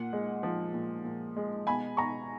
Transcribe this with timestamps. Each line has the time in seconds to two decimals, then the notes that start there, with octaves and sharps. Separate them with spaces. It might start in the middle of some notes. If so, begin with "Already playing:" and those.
Already playing: A#2 F#5
0.13 G#3
0.43 F3
0.74 A#2
1.05 A#2
1.36 G#3
1.66 B2 G#5 B5
1.97 B2 A#5 C#6